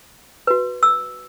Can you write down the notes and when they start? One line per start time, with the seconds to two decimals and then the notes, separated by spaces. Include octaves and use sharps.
0.47 F#4 B4
0.83 E6